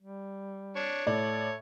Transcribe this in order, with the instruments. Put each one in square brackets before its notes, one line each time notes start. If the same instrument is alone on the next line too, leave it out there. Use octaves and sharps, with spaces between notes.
[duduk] G3
[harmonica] D4 C#5
[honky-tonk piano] A2 D5 [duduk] A4 [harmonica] C#5